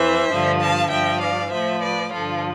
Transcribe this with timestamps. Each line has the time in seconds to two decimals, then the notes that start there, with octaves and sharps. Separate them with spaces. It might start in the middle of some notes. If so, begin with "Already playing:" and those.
Already playing: F2 E3 C5 E5
0.29 G2 D3 F3
0.60 F5 A5
0.91 G2 F3 E5 G5
1.21 D5 F5
1.52 A2 F3 C5 E5
1.83 B4 D5
2.13 G2 D3 F3 F4 A4